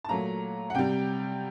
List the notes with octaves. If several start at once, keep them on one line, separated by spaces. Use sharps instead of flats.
A5
A#2 F#3 A3 A#5
F#5
C3 G3 G5